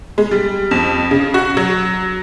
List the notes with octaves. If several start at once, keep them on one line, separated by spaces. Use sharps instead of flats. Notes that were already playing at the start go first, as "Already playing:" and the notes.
G#3
G3
F2
C#3
F#4
F#3